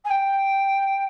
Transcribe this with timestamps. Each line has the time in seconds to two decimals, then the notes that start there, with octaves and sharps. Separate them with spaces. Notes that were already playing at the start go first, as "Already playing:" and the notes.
0.04 G#5
0.10 G5